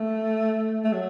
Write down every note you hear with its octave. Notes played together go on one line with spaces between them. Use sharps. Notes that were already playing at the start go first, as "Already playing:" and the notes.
Already playing: A3
A3
F#3